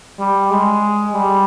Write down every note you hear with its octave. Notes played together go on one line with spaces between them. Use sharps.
G3
G#3
G3